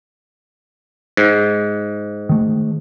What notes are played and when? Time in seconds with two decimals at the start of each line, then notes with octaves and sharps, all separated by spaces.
1.17 G#2
2.29 D#3 A3